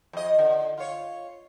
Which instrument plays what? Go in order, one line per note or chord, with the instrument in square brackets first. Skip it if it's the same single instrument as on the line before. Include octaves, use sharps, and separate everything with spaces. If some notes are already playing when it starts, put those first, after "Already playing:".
[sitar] F2 D#5
D3
F4 C#5